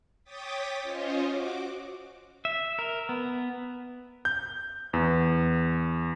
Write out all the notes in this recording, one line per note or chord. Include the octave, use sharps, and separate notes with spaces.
C#5 G5 D6 D#6 A6 B6
C#4 F4 C5 C#5 D#5
F#4 D6
E5
A#4
B3
G6
E2